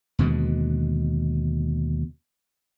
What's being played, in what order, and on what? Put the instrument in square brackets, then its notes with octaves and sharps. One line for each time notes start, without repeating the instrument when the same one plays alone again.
[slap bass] D#2 B2 D3 G#3